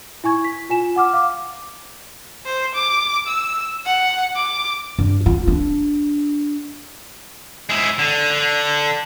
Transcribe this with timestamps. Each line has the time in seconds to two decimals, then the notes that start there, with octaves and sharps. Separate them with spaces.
0.24 E4 G#5 C#6 G#6
0.44 B6
0.70 F4 G#5 E7
0.96 F#5 D6 F6
1.13 F5 D6
2.46 C5
2.75 D6
3.27 E6
3.86 F#5
4.35 D6
4.99 G2
5.26 F4
5.47 D4
7.69 G#3 E4
7.99 D3
8.31 D3